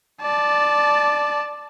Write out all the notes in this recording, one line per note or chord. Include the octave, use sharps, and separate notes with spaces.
D5 A5